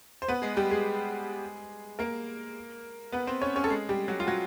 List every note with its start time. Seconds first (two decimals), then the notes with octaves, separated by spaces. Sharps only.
0.22 C5
0.28 B3 B4
0.42 G#3 G#4
0.57 G3 G4
0.70 G#3 G#4
1.99 A#3 A#4
3.12 B3 B4
3.27 C4 C5
3.42 C#4 C#5
3.56 C#4 C#5
3.64 A4
3.70 G#3 G#4
3.89 G3 G4
4.08 F#3 F#4
4.20 F4
4.27 F#3 F#4